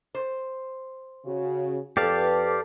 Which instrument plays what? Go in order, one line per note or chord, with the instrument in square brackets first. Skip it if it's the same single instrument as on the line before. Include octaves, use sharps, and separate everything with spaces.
[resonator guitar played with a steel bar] C5
[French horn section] C#3 F#4
[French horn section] F2 B4 [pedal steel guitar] G4 D5 F5 [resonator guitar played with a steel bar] A4